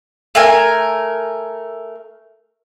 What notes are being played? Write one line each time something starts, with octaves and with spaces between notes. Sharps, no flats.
A3 A#4 G#5